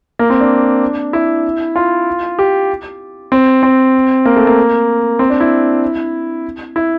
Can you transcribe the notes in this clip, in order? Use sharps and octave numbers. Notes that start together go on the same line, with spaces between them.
A#3
C4
D4
E4
F4
G4
C4
C4
A#3
A3
A#3
C4
D4
E4
E4